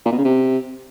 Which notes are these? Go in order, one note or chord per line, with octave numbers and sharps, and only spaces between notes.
A#2
B2
C#3
C3